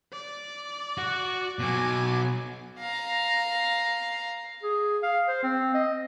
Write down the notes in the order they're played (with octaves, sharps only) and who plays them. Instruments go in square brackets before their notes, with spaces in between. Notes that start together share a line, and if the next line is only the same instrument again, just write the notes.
[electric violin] D5
[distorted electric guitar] F#4
[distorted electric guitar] B2 F#3 [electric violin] G#5 D6
[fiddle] F5 A#5
[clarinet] G#4
F5
C5
C4
D#5